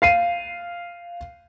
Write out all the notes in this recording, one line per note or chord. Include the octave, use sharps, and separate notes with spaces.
F5 C7 D#7